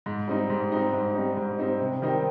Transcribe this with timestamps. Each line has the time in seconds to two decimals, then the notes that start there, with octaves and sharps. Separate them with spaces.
0.06 G#2
0.28 G3 C4 D#4
0.50 G#2
0.72 G3 C4 D#4
0.93 G#2
1.15 G3 C4 D#4
1.37 G#2
1.59 G3 C4 D#4
1.80 C3
2.02 D#3 G3 C4 D#4